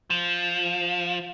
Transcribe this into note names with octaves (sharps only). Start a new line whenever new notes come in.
F3